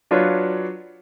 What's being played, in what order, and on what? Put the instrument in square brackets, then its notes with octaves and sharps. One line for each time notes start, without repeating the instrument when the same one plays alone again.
[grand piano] F#3 D4 F4 B4 C#5